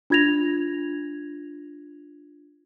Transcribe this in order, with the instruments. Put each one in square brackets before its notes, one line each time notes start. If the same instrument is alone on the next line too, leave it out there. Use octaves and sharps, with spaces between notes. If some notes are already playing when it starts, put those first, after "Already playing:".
[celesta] D4 F4 G#6 A#6 F7